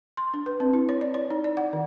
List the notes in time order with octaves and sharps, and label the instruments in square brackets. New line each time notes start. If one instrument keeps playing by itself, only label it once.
[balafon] C6
D4
B4
C4
E4
C#5
D5
C#5
D#4
D5
F#5
D#3